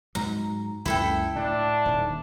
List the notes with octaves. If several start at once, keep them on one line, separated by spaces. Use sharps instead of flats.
G#2 F#3 A#5
C#2 F#2 A#2 E4 A4 G5
A2 D4
D#1 D#3